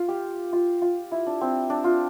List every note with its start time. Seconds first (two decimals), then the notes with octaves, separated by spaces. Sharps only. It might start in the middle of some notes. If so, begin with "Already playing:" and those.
Already playing: F4
0.08 G4
0.53 F4
0.82 F4
1.11 E4
1.26 D4
1.41 C4
1.70 D4
1.84 F4